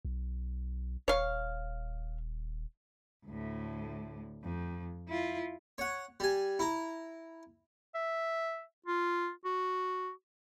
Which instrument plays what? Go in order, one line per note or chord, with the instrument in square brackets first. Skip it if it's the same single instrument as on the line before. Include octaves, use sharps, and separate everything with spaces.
[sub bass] B1
[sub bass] D#1 [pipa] C#5 F5
[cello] D2 A2
F2
E4 F4
[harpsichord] C#5 F#5
G3 G#5
E4 A#5
[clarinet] E5
F4
F#4